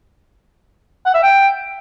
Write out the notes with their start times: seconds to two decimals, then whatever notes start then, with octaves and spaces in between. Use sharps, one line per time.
1.06 F#5
1.14 E5
1.23 G5